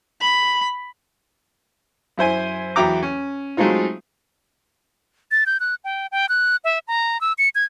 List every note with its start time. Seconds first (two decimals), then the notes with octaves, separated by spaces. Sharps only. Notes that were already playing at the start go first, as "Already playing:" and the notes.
0.21 B5
2.18 F#2 E4 C5 G#5
2.76 E2 F#3 E4 G5 A#5 D6
3.03 C#4
3.57 F#3 G#3 A3 C4 D#4 F4
5.31 A6
5.46 G6
5.60 F#6
5.84 G5
6.12 G5
6.29 F#6
6.64 E5
6.88 A#5
7.21 E6
7.38 C#7
7.55 G#6